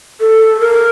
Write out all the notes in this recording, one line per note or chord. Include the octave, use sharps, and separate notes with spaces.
A4
A#4